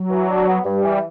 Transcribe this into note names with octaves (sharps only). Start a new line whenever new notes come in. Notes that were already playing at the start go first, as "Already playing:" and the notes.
Already playing: F#3
E3
D4
B3
G2 G3
E3